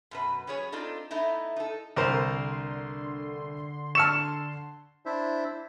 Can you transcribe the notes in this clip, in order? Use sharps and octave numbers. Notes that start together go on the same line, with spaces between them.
F#2 B2 B4
F#3 B3 C#4 G#4 C#5
C4 D4 D#4 F4 A4
A3 B3 D#4 E4
D#4 A4
C2 D3 A#4 C5 C6
A5 C#6 E6 F6 C#7 E7
D4 E4 C5 E5